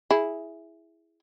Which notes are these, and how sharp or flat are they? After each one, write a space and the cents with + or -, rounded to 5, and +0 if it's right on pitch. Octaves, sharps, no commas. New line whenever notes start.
E4 +0 G#4 +0